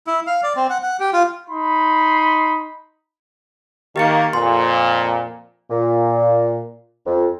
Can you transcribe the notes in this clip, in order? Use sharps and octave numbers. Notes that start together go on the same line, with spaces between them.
E4
F5
D5
C4
F#5
F#5
G4
F4
D#4 B5 C6
D#3 A#3 G4 A6 C#7
F2 A#2 C6
A#2
F2